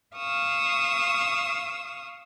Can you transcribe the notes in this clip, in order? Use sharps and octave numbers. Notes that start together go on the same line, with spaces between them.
F5 C#6 D#6 E6